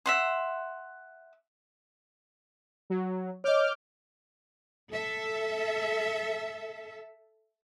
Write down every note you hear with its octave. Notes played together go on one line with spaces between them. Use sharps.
E5 F#5 C6
F#3
C#5 D#5 D6 F6 G6
A4 E5